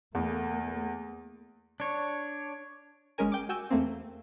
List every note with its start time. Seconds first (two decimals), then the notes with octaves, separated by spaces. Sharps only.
0.15 E2 A3 A#3
1.80 D4 C#5
3.18 G1 G#3 C#4 A#4 G#5
3.32 G5 D6
3.49 F#4 G5 G#5 E6
3.71 E2 A3 A#3 C4